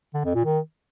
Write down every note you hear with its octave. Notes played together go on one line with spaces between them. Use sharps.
D3
F2
A#2
D#3